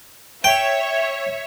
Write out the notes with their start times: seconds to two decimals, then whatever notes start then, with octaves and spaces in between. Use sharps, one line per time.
0.44 C#5 E5 G5